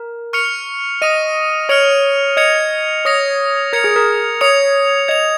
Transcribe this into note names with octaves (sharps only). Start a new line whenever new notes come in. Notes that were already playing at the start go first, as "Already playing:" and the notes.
Already playing: A#4
C#6 F6 C#7 F7
D#5 D#6 A#6 D#7
C#5 F6 C#7 F7
D#5 G#6 C#7 F7
C#5 D#6 A#6 C#7 F7
A#4 G#6 C#7 F7
G#4
A#4
C#5 D#6 C#7 F7
D#5 G#6 F7